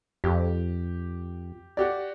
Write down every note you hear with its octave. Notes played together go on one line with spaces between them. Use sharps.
F2 G4
F#4 G4 D5